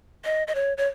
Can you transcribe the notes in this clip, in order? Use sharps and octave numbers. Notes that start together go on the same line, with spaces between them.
D#5
D#5
C#5
C#5